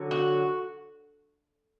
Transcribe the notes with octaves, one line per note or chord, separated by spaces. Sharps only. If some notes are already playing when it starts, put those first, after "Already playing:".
Already playing: D3 F#3
F#4